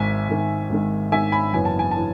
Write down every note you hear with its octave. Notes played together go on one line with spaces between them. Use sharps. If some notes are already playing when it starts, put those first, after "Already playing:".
Already playing: G#1 G#2 D#3 E5 G#5
G#1 G#2 D#3
G#1 G#2 D#3
G#1 G#2 D#3 E5 G#5
G#5 B5
F#1 F#2 E3 B3 G#5
A5
G#5
A5
E3